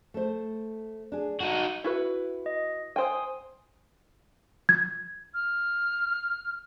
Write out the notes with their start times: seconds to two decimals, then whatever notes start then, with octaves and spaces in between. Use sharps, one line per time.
0.14 A3 A4 C5
1.12 D4 G#4
1.40 D#4 F#4 A4
1.84 E4 F#4 B4
2.46 D#5
2.96 C5 G5 G#5 C6 D#6
4.69 G#6
5.34 F6